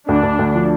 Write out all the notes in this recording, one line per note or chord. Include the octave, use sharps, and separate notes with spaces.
D2 D4
D2
D2
F3